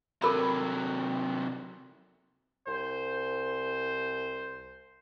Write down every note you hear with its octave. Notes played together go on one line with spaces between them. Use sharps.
C3 F#3 A4 A#4 B5
C2 C5